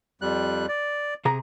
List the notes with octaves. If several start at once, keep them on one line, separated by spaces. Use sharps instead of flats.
F2 G3 F#6
D5
C3 G#4 A#5